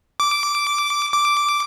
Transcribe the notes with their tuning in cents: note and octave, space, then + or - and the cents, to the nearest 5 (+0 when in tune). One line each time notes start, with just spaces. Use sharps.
D6 -10
D6 -5